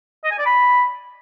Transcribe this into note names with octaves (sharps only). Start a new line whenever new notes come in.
D#5
G#5
D5
B5